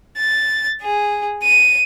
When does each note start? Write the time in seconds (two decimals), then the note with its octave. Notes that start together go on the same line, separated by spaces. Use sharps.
0.17 A6
0.82 G#4
1.43 D#7